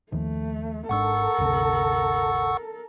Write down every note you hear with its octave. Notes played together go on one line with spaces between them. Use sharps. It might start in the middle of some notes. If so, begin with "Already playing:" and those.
D#2 D#3 F3 A3
G#1 G#2 D4 A4 A#4 F#5 C#6 E6
G1 D2 C3